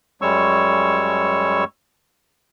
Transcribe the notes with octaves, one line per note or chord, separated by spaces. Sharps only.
F#2 G3 G#3 C#5 C#6 E6